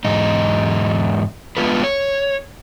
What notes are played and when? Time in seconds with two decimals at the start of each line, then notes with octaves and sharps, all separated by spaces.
0.05 E2 G#2 D#4
1.57 G#3 B3 F4 A4 B4
1.84 C#5